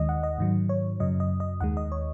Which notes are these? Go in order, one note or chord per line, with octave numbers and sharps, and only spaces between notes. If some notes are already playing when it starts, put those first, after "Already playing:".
Already playing: D#2 D#3 G#3 D#5
F#5
D#5
G#2 D#3 F#3
C#5
F#2 C#3 F#3 D#5
D#5
D#5
D#2 D#3 G#3 F#5
D#5
C#5